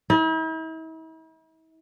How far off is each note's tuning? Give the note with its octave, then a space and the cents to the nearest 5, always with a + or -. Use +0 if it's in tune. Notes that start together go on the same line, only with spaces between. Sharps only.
E4 -45